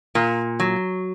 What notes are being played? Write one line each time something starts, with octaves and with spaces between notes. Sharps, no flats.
A#2
F#3